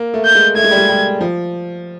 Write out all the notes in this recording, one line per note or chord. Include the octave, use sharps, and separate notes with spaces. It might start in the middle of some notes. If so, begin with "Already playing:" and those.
Already playing: A#3
A3
G6
G#3
A3 G#6
G#3
G3
G#3
G3
F3